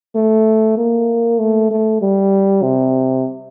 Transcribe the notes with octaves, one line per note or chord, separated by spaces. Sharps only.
A3
A#3
A3
A3
G3
C3